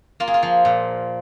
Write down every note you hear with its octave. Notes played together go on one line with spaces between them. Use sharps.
A#3 F4
G#4
F4
F3
A#2